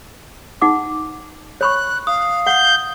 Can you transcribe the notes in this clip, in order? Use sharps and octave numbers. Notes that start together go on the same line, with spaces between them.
D#4 F#5 D6
C#5 B5 C#6 F#6
F5 D#6
F#5 G6